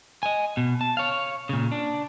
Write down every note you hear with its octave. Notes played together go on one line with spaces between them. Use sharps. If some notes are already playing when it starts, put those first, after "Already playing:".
D#5 G#5
B2
A5
C#5 F5
A#2 C#3
D4